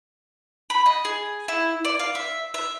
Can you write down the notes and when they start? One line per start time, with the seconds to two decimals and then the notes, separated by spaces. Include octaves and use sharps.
0.70 B5
0.86 D#5
1.05 G#4
1.48 E4
1.85 D5
1.99 F5
2.15 E5
2.54 E5